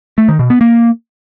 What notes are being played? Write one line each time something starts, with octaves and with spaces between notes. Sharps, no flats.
A3
D#3
B2
B3
A#3